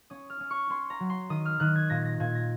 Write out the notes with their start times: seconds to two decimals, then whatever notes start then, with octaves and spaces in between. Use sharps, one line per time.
0.10 C#4 D#6
0.30 F6
0.40 C#4
0.50 C#6
0.70 C#4 C6
0.90 A#5
1.00 F#3
1.10 C6
1.30 D#3 D#6
1.45 F6
1.60 D#3 F#6
1.75 G#6
1.90 A#2 A#6
2.05 A#6
2.20 A#2 G#6
2.35 A#6